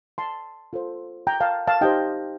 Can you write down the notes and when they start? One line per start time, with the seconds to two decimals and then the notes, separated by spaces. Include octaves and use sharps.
0.18 A5 C6
0.73 F4 A4 C5
1.27 G5 A#5
1.40 F5 A5
1.67 F5 A5
1.81 D#4 G4 C5 D#5 G5